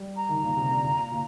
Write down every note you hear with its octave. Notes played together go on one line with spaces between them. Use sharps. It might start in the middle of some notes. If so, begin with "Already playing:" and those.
Already playing: G3
A#5
D#3
A#2
C3
D3
A#2
A#2